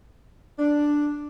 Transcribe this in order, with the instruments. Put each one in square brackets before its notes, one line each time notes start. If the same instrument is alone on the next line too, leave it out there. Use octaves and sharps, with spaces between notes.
[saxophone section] D4